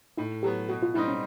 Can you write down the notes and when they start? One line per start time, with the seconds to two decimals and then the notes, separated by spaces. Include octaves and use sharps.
0.17 A2 D#4
0.43 F#3 B3 G4
0.69 B2 F#4
0.82 F4
0.94 G3 C4 D#4 E4
1.08 C#4